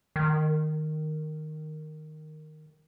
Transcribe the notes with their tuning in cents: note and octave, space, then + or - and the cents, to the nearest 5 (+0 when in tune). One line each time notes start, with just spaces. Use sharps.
D#3 -10